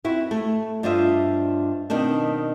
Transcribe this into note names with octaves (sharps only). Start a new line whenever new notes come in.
C4 E4 F#4
A3
G2 D4 F4 C5 D#5 E5
B2 D#3 C4 D4